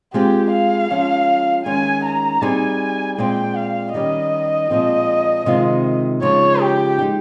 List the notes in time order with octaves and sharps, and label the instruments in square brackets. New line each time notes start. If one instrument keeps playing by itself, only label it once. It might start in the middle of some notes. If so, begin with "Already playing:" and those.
[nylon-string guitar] G#3 C4 F4 G#4 [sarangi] G4
[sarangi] F5
[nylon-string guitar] F3 G#3 C#4
[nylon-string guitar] D#3 G#3 C#4 [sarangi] G#5
[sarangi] A#5
[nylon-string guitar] G3 C4 D#4 G#4 [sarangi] G#5
[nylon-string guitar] A#2 G#3 C4 [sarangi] G5
[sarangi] F5
[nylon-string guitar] D#3 G3 C#4 G4 [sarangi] D#5
[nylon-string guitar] A#2 F3 G#3 C4
C3 D#3 G#3 C4 F4
[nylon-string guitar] C#3 F3 G#3 D#4 [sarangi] C#5
[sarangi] G4
[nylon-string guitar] G#3 D#4 G4